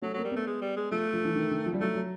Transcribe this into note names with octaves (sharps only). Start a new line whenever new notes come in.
F#3 A3
F#3 A#3
G3
A3 B3
G#3
G3
G#3
F3 A3
F3
E3
D#3
D#3
F3
G3
F#3 A3
F#3